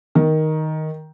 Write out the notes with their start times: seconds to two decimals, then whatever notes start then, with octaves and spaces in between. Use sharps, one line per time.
0.15 D#3